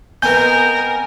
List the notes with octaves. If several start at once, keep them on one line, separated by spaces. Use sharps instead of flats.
B3 C4 D#4 A#4 G#5 G6